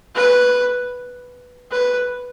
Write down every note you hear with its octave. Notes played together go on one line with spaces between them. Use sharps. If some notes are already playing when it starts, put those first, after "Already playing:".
B4
B4